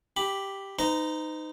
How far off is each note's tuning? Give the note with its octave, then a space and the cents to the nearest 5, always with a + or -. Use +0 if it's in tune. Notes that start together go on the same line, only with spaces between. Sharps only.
G4 +0 B5 +0
D#4 -5 C5 -45 A#5 +0